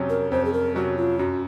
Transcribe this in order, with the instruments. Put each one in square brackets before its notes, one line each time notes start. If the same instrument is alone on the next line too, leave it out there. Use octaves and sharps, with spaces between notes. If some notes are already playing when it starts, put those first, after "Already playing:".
Already playing: [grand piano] F2 C3 F#3 C#4
[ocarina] A#4
[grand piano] F2 [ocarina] C5
[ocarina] G#4
A#4
[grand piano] C3 F#3 C#4 [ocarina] F#4
[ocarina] F4
[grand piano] F#2 [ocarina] F#4